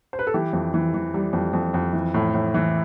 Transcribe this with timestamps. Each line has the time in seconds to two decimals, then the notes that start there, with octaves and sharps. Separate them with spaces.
0.13 C5
0.19 B4
0.27 A4
0.34 E3 G4
0.53 F2
0.74 E3
0.94 E3
1.14 G3
1.33 F2
1.53 F2
1.74 F2
1.93 E3
2.14 A2
2.34 A2
2.54 E3